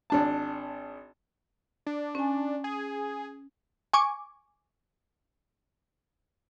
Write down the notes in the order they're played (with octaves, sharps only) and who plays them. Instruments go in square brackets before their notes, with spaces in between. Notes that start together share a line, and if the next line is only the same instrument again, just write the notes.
[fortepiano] G#1 D4 A5
[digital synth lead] D4
[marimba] C#4 G#5
[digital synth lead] G#4
[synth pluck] G#5 C#6 D6